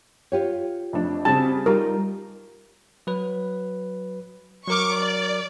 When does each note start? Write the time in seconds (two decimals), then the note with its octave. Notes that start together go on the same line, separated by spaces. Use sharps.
0.32 F4 G4 C#5
0.93 F2 A3 D4
1.25 C#3 G3 C4 F#4 G4 A5
1.66 G3 D#4 F4 A#4 A#5
3.07 F#3 B4
4.68 F#3 A#4 C#6 D6 F6
4.98 D5